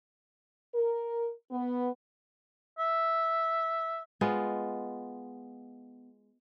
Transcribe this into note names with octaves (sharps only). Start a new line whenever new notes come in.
A#4
B3
E5
G#3 B3 F4